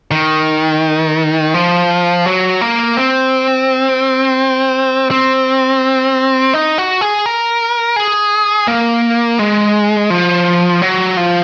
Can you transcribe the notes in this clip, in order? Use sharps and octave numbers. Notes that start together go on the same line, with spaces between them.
D#3
F3
F#3
A#3
C4
C4
D#4
F#4
G#4
A#4
G#4
A#3
G#3
F3
F#3
F3